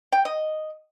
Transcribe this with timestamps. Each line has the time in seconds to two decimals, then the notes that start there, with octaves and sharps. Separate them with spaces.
0.12 G5
0.25 D#5